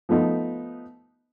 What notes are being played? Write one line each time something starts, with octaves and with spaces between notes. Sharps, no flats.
F3 A3 B3 D#4